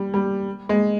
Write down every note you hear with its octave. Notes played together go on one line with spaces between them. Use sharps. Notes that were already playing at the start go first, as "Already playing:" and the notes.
Already playing: G3
G3
G#3